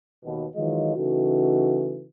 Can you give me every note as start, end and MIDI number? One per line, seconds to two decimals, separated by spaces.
0.25 0.45 39
0.25 0.45 47
0.56 0.95 51
0.56 0.95 52
0.56 0.95 54
0.56 0.95 56
0.56 0.95 65
0.56 0.95 75
0.96 2.04 49
0.96 2.04 52
0.96 2.04 57
0.96 2.04 63
0.96 2.04 66